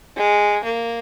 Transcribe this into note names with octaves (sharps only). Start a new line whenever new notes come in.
G#3
A#3